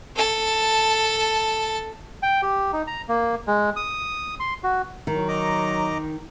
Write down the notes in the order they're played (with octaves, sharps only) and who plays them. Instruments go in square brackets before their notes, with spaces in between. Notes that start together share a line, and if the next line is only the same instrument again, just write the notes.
[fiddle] A4 A5
[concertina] G5
G4
D#4
A#5
A#3
G#3
D#6
C6
F#4
[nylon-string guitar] D#3 [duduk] F#3
[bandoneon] D#5 A#5 D6